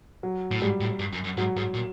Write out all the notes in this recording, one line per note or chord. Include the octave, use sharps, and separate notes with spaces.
F#3
A2
G#2 G3
A2
G2
F#2
F#2
G#2 F#3
G#2 F#3
A#2